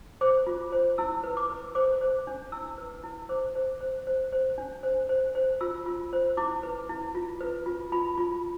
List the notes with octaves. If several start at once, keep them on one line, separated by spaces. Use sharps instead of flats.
C5 D6
F4
C5
E4 E6
B4
D6
B4
C5 D6
C5
D4
E4 E6
B4
E4
C5 D6
C5
C5
C5
C5
D4
C5
C5
C5
F4 E6
F4
C5
E4 D6
B4
E4
F4
B4
F4
F4 B5
F4